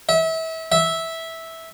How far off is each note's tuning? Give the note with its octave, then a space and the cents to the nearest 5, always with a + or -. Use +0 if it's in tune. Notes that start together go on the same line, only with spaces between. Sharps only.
E5 -30
E5 -10